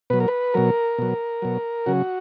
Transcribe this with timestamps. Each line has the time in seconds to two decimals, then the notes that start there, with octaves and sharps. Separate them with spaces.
0.10 B2 F#3 B4
0.20 A#4
0.28 B4
0.54 B2 F#3 A#4
0.98 B2 F#3
1.42 B2 F#3
1.86 C#3 F#3 F#4